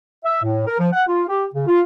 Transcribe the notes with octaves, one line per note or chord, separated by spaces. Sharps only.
E5
A2
A#4
F3
F#5
F4
G4
C#3
F4